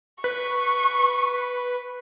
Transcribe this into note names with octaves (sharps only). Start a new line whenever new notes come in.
B4 C#6